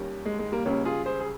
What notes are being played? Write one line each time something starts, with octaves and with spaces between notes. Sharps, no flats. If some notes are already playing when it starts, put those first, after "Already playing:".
Already playing: D#2 D#3 G3 C#4
G#3
G#3
G3 A#3
C#2 C#3 G3 A#3 C#4
F4 G#4
G#4 C5
G#4